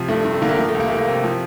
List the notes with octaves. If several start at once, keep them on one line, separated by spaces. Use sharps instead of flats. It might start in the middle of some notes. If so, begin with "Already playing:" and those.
Already playing: C3 F3
G2 A3
G2
A3
D3 A#3
A3
F3 A#3
A3
C2
A#3
C2 A3
A#3
C3
F3